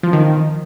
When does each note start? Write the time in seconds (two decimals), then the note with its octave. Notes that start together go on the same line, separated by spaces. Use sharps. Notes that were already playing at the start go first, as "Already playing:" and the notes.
0.03 F3
0.13 D#3